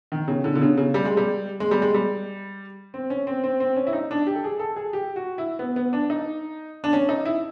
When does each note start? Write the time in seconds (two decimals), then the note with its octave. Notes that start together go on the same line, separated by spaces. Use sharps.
0.12 D#3
0.28 C#3
0.44 D3
0.55 D3
0.61 C#3
0.77 C#3
0.94 G3
1.05 G#3
1.17 G3
1.60 G#3
1.71 G3
1.82 G#3
1.94 G3
2.94 C4
3.10 C#4
3.27 C4
3.44 C4
3.60 C4
3.76 C#4
3.87 E4
3.93 D#4
4.11 D4
4.27 G4
4.35 A4
4.44 G#4
4.59 A4
4.76 G#4
4.93 G4
5.16 F#4
5.38 E4
5.59 B3
5.76 B3
5.93 D4
6.10 D#4
6.84 D4
6.93 C#4
7.09 D#4
7.25 E4